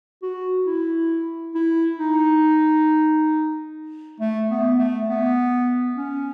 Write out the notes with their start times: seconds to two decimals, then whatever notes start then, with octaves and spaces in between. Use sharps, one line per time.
0.22 F#4
0.66 E4
1.55 E4
1.99 D#4
4.20 A3
4.50 B3
4.79 A3
5.09 B3
5.97 C#4